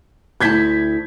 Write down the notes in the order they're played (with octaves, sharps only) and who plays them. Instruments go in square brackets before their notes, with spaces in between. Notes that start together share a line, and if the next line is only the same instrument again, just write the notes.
[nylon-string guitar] D2 E4 A5 [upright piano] G6 G#6 B6